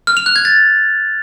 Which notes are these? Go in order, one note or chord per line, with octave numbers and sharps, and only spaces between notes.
F6
F7
F#6
G#6
A6